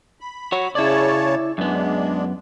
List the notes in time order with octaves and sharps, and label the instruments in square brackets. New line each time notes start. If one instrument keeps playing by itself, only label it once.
[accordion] B5
[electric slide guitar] F#4 C#5
[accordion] C#3 C#5 A5 [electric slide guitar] E4 D5
[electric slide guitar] F#2 B3 [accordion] G#3 D4